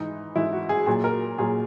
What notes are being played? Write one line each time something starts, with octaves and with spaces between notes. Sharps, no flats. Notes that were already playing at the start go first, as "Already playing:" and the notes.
Already playing: G#2 E3 D#4
G#2 E3 E4
F#4
G#4
A#2 F#3 G#4
A#4
A#2 F#3 G#4